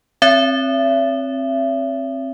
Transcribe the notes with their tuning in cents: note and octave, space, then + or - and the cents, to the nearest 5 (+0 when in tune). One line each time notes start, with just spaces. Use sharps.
C4 +20 C#5 +40 E5 +35